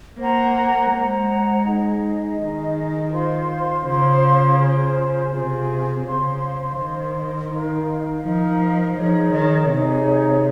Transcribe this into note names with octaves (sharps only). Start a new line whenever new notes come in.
A#3 C5 F#5 A#5
G#3 C5 F#5 A#5
D#4 G#4 D#5
D#3 D#4 G#4 D#5
F4 C5 F5 C6
C#3 F4 C5 F5 C6
F4 G#4 C5
C3 F4 G#4 C5
C#3 C5 F5 C6
D#3 C5 F5 C6
D#4 A#4 F5
F3 D#4 A#4 F5
F3 D#4 G#4 C#5
D#3
C3 D#4 G#4 C#5